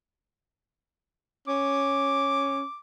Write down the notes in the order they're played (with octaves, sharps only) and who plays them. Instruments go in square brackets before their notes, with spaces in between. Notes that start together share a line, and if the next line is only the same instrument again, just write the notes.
[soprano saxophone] C#4 [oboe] D6